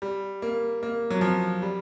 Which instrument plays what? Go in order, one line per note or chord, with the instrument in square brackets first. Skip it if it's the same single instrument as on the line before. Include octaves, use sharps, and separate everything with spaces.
[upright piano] G3
A#3
A#3
F#3
F3
G3